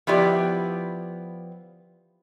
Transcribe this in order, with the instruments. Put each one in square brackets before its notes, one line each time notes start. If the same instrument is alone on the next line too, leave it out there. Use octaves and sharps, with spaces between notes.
[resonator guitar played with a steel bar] F3 B3 E4 G4 D5